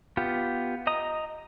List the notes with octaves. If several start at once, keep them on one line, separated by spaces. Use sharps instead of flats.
B3 F4 G4
D#5 A#5 D#6